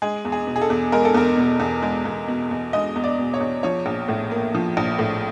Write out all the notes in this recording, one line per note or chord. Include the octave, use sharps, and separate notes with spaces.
G#3 G#4
E2
G#4
B2
G#4
A4
E2
G#3 A#4
A4
E2 A#4
B2
E2
G#3
E2
B2
E2
G#3 D#5
E2
D5
B2
C#5
E2
F3 C#5
A#1
A2
A#3
F3
A#1
A2